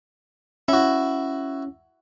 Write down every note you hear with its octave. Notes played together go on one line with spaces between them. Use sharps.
C#4 E4 F#4